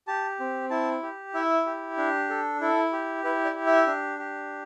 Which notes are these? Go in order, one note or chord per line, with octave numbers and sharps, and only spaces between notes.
G4 A5
C4
E4 A5
G4
E4 E5
G4
D4
A4
E4 A4
G4
E4 B4
D5
G4
E5
D4
G4